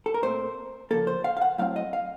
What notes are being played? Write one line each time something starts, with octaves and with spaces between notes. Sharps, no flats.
A4
A#4
A#2 A3 C4 C5
C#3 F3 A#3 A4
C5
F5
F5
F#5
A2 F#3 C4 F5
D#5
F5